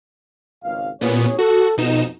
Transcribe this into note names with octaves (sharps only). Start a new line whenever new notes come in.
G#1 C#2 F5
A1 A#2 B3 G#4 C#5
F#4 A4
F2 B2 D#4 E7